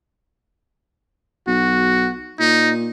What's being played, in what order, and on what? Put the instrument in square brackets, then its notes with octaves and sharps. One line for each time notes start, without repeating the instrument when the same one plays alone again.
[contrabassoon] B1 [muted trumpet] F#4
[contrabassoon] A#2 [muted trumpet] D#4